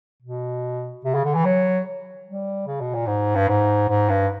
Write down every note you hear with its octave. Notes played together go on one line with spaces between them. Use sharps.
B2
C3
C#3
D3
E3
F#3
G3
C#3
B2
A#2
G#2
G2
G#2
G#2
G2